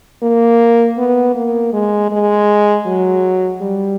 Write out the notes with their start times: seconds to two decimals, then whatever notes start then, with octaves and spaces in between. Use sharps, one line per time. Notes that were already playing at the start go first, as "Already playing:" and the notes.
0.23 A#3
0.98 B3
1.35 A#3
1.73 G#3
2.11 G#3
2.86 F#3
3.61 G3